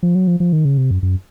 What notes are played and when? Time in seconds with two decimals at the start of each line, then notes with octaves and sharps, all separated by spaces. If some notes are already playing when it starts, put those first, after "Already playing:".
0.03 F3
0.15 F#3
0.27 F3
0.40 F3
0.53 D#3
0.65 C#3
0.78 C3
0.91 F#2
1.03 F#2